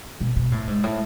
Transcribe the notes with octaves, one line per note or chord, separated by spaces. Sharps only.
B2
B2
A2
G#2
A2